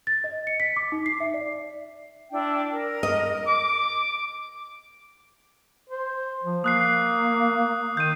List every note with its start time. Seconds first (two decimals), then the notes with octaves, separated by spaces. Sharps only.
0.07 A6
0.24 D#5
0.47 C#7
0.60 B6
0.76 D6
0.92 D#4
1.06 C7
1.20 E5
1.34 D5
2.31 D4 E4 G5
2.73 A#4
3.03 D#5
3.47 D6
5.89 C5
6.43 F3
6.64 A#3 D#6 F#6 C7
7.97 D#3 G6 D#7